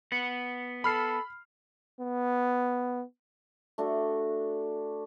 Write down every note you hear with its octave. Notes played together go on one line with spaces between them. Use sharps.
B3 F#5
A4 B5 F6 C7
B3
A3 D4 F#4